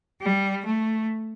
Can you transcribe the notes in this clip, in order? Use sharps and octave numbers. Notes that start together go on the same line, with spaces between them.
G3
A3